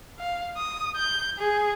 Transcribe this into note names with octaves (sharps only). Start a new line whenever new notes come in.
F5
D#6
G6
G#4